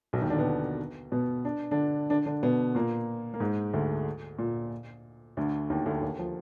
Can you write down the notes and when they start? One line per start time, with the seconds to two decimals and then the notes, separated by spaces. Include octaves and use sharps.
0.13 B1 B2
0.22 D#2 D#3
0.30 D3 D4
0.38 B2 B3
1.12 B2 B3
1.45 D4
1.71 D3 D4
2.10 D3 D4
2.26 D3 D4
2.43 B2 B3
2.75 A#2 A#3
3.34 A#3
3.40 G#2 G#3
3.73 D2 D3
4.39 A#2
5.37 D2 D3
5.70 D#2 D#3
5.86 D2 D3
6.02 D#2 D#3
6.19 F3